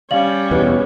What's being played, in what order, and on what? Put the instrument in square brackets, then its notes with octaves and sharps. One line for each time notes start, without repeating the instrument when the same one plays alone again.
[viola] G3 C#4 [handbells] D5 [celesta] F5 F#7
[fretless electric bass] E2 B2 [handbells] B4 C#5